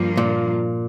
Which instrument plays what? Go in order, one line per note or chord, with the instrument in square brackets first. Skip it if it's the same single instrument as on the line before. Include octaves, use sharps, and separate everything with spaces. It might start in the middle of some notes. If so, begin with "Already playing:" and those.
Already playing: [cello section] G2 F3 A#3 F4
[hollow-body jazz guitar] A#2